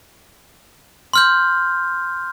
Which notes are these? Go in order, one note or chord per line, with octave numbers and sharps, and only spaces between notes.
C6 F6 G6